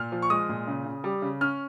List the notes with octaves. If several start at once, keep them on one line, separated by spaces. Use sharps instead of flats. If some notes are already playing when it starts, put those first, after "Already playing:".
Already playing: A#2 F6
F3
C#6
G#3 D#6
A#2
C#3
C#3
G3
C#3
C#4 F6